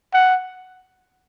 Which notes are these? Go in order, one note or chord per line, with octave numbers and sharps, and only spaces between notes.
F#5